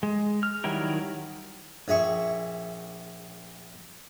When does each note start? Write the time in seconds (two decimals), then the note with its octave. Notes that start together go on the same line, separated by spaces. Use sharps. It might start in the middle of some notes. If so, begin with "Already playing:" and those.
0.03 G#3
0.43 F6
0.64 D#3 F#3 G3 E4 A#4
1.88 A#1 G#4 E5 C#6